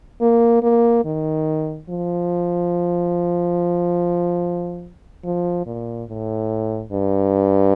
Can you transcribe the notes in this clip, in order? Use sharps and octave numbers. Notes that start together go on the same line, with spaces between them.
A#3
A#3
D#3
F3
F3
A#2
A2
G2